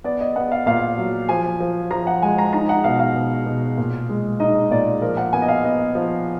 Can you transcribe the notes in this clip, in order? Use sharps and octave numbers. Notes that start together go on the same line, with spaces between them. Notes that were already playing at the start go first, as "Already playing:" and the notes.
B3 D5
D#5
B3 F#5
F5
A#2 F5
F#3
F3 G#5
F3
F3 A#5
F#5
G#3 G#5
A#5
D#4 A#5
F#5
B2 F5
F5
B2
B2
A#2
G#3
D#4 D#5
A#2 D5
F3 A#4
F#5
B3 G#5
D#5
F5
B3 D#5
F3